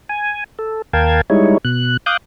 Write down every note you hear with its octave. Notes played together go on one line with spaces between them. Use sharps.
G#5
A4
D#2 A#4 F5 G5 A5 G#6
G3 G#3 D#4 E4 C#5
B2 F#6
F5 D6 D#6 F#6 G6